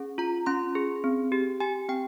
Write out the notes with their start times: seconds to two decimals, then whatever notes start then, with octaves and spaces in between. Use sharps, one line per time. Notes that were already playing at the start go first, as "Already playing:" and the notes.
Already playing: C#4 G#4
0.18 F4 A#5
0.46 C#4 C6
0.75 G#4
1.04 C4
1.32 G4
1.60 G4 G#5
1.89 C4 G5